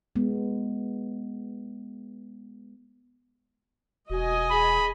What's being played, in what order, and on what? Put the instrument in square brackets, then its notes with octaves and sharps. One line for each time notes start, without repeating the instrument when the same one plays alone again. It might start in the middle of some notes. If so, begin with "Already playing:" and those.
[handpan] G#3 B3
[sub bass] E1 [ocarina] F#4 [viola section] D#5 G#5
[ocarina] G#4 [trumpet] B5